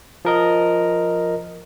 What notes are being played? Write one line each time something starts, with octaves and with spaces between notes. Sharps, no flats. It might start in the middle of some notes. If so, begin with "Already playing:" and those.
F3 A#4 D#5